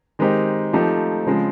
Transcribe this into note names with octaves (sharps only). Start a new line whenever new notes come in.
D#3 G#3 C4 D#4 G4
F3 A3 C4 D#4 G4
C#3 F3 G#3 C4